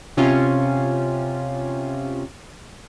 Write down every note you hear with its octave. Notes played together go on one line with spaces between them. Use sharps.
C3 C#4 F4